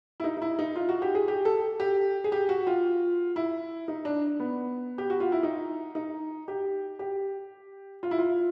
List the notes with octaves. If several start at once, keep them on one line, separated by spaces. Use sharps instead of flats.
E4
D#4
D#4
E4
D#4
F4
F#4
G4
G#4
G4
A4
G4
G#4
G4
F#4
F4
E4
D#4
D4
B3
G4
F#4
F4
E4
D#4
D#4
G4
G4
F4
E4
F4